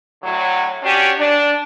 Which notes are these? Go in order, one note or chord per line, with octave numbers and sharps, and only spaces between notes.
A2 D3 F#3
C#4 D4 F#4 G4
D4